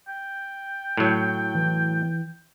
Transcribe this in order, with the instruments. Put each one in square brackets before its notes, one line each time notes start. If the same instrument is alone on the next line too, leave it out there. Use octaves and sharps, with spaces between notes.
[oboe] G5
[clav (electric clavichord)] A2 F#3
[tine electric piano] E3